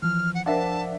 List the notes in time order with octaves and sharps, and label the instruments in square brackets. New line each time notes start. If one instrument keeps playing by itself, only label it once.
[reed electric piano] E3 F3 [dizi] F6
[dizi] F#5
[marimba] F3 A#4 C5 [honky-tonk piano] D4 E5 [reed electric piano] F#5 [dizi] A5